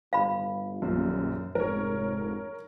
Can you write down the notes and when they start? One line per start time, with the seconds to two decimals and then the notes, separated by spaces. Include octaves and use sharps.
0.13 G1 F5 B5
0.82 D#1 A#1 F#2
1.55 F1 G#2 A#4 C#5